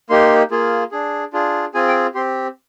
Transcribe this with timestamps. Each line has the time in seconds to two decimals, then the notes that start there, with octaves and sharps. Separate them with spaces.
0.10 A#3 D#4 G4 C6
0.51 A#3 F4 G#4
0.91 D4 G#4
1.33 D4 F4 G#4
1.74 C4 F4 G#4 G#5
1.88 G5
2.14 C4 G4 C6